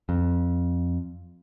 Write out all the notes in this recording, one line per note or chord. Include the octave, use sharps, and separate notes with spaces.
F2